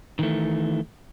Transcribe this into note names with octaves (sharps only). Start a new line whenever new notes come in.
D#3 E3 A3